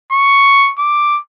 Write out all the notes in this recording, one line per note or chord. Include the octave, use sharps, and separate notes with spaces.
C#6
D6